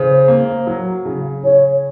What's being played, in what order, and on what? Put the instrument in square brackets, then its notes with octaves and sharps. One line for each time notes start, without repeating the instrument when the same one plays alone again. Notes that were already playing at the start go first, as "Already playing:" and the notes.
Already playing: [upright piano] C#3 [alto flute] C5
[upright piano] A#3
F#3
C#3
[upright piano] C#3 [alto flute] C#5